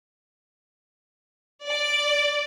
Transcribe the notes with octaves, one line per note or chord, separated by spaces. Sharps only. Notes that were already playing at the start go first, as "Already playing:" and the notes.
D5